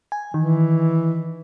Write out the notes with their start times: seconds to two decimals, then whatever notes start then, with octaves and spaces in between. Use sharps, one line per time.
0.12 G#5
0.34 D#3 E3